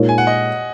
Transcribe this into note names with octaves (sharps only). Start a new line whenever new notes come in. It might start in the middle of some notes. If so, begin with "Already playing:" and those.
Already playing: A#2 G#3 D#4 A#4 C#5
G#5
F#5
D#5